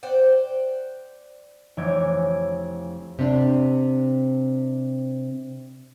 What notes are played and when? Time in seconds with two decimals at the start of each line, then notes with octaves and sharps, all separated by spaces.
0.03 C5 D5 F#5 G5
1.77 F1 E3 C#5 D6 G#6
3.19 C3 C4 D4